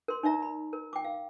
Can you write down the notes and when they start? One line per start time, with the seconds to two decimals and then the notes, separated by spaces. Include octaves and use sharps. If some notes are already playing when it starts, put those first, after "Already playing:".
0.08 A#4 C6
0.23 D#4 D5 E5 A#5
0.42 B5
0.73 A#4
0.93 G5 D6
1.04 F5